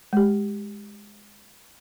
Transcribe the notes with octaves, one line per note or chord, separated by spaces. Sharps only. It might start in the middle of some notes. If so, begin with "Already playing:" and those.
G#3 G4